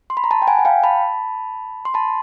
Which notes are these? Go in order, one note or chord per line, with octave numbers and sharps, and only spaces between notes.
C6
B5
A#5
A5 B5
G5
F#5 G#5
F#5
F5 G5
A5 B5
C6
A5 B5